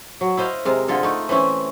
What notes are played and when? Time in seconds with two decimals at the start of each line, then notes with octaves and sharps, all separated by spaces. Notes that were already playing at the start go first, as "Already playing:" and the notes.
0.21 F#3
0.37 E4 C5 D#5 F5
0.65 C3 G#3 A#4
0.88 D3 F4 G#4 A4
1.03 A3 D#4
1.29 E3 C4 C#4 E4